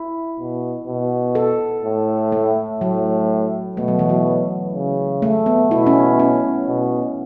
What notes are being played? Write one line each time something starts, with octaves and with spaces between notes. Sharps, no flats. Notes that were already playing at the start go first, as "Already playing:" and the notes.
Already playing: E4
B2
B2
A4
A2
A3
A2 F#3
B2 A3
F#3
E3
F#3
C#3
A3
B3
B2 E4
C#4
C#4
B2